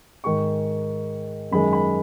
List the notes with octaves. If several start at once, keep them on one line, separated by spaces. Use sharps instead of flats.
G#2 D#3 G#3 C#6
F#2 D#3 G#3 B5
B5